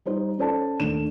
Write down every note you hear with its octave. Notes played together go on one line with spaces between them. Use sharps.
G3 D#4 C5
C#4 A4 C5 D5 A5
D#2 A3 D4 E7